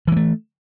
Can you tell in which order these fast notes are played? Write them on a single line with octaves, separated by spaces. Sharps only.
E3 G#3 A3